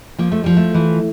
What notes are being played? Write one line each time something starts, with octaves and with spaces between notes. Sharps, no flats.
F3 A#3
A3
F3 G3
A3
E3